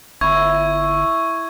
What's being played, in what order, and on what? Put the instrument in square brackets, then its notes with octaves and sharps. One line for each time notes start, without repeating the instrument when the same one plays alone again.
[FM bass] G1 [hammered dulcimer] E4 [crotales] C#6 G#6